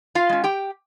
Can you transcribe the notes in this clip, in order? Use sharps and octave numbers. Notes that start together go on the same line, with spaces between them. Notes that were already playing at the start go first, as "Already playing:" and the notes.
F4 F5
G#3 C#4
G4 G5